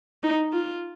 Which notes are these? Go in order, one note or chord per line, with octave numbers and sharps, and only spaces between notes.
D#4
F4